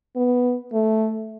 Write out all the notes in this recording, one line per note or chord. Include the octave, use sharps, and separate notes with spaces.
B3
A3